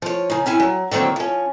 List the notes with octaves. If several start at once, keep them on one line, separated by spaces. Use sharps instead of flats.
F3 C#5
C#3 D#4
C4 C#4 E4 G#5
F#3
D3 D#3 F#3 A#3 C4
F3 C#4